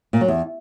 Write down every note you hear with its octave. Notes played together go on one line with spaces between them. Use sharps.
A#2
F#3
E2